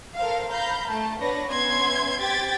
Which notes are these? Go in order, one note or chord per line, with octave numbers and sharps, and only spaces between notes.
A4 A#4 C5 F5
F5 A#5 B5 G6
A3 A5
B3 D4 B4 C#5 A#6
B3 C#4 E5 C6 G#6
C4 G4 G5 G#6 A6 B6